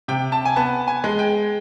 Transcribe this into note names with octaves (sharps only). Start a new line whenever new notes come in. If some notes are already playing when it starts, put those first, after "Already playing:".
C3 G5
A5
G#5
B3 A5
G#5
G#3
G5